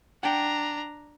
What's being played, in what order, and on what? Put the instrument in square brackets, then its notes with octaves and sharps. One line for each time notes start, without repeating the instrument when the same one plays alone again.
[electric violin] D4 A#5 [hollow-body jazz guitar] F#5 G5